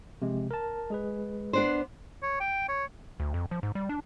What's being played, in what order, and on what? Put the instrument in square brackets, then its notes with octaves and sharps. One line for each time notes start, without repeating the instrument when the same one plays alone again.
[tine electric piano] C3 F3 G#3
A#4 A5
G#3 G#4 B4
[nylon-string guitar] B3 D4 C5
[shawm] C#5
G5
C#5
[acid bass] D2
F2
F3
G#2
G3
D4